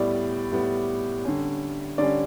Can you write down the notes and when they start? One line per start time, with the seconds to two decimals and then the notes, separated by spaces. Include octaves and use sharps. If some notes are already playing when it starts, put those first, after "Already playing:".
Already playing: A2 G3 B3 D5
0.52 A2 G3 B3
1.25 D3 G3 C#4
1.98 D3 G3 C#4 D5